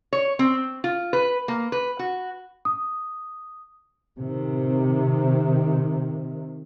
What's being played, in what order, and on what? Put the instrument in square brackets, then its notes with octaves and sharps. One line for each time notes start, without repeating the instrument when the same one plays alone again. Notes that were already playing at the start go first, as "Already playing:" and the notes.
[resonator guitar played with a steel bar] C#5
C4
F4
B4
A#3
B4
F#4
[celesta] D#6
[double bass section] C3 D#3